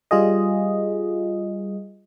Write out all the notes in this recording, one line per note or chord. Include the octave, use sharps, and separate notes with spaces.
G3 F4 G#4 D#5